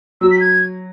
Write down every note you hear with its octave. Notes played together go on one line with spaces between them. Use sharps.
F#3 E6
B6
G#6